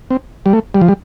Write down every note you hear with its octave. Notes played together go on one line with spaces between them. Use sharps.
C4
G3
A3
G3
F3
G3